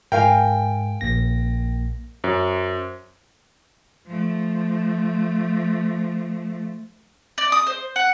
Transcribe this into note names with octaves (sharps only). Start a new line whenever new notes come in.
G#2 G#3 A#4 F5 G5 G#5
A#1 A#3 A#6
F#2 C5
F3 A3
D5
D#6
C5
F#5